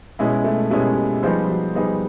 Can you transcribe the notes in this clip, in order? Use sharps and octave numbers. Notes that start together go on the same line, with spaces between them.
B2 G#3 C#4 E4
A3
B2 G3 G#3 C#4 E4
F3 G3 B3 D#4 G#4 C5
F3
F#3
G3 B3 D#4 G#4 C5